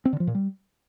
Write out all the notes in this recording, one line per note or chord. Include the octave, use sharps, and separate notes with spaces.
C4
D3
F3
A#2
G3